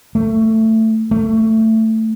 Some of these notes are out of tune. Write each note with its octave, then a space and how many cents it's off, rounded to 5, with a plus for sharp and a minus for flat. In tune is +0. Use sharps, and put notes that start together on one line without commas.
A3 +15
A3 +15